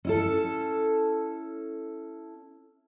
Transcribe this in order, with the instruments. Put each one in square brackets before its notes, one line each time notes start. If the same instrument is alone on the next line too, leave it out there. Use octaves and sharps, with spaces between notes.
[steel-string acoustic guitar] C#4 E4 A4